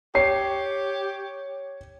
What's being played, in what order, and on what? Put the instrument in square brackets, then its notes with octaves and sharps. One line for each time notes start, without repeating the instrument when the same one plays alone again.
[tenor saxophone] G4 [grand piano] C#5 C7